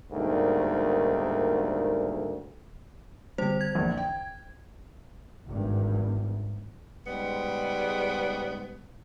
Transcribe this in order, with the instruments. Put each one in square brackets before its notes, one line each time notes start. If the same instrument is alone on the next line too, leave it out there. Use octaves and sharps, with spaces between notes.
[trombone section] D2 G#2 B2 D#3 G3 A#3
[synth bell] D3 C5 [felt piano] G3
[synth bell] G#6
[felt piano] A#1 E2
G5
[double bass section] G#1 E2 G2
[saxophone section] G#2 C#3 G3 G#3 B3